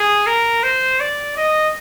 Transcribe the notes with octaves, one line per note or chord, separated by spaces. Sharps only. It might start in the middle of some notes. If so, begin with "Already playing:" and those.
Already playing: G#4
A#4
C5
D5
D#5